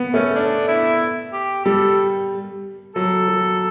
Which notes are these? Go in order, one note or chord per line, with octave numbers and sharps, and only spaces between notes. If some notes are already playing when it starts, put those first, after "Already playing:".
Already playing: B3
A3 C#4
D4
E4
G4
G3 A4
F#3 A4
F#3